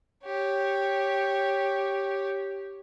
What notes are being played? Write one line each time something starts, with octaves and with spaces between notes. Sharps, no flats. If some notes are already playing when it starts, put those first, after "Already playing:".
G4 C#5